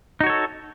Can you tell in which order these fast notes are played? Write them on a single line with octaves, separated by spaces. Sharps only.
D#4 F#4 C#5 A4